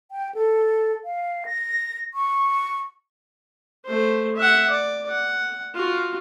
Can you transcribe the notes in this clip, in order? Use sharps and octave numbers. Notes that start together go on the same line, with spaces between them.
G5
A4
F5
A#6
C#6
A3 C5
E5 F#5
D5
F#5
F4 F#4